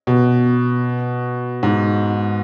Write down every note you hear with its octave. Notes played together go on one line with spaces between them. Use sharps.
B2
G#2